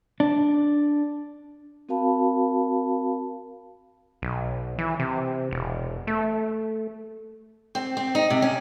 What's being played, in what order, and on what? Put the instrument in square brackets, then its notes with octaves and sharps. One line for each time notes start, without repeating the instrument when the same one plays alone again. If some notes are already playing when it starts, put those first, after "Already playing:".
[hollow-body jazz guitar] D4
[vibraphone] C4 F#4 A#4 F5 A5 B5
[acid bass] B1
E3
C3
E1
A3
[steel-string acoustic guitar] C4
C4
D#4
C3
C#4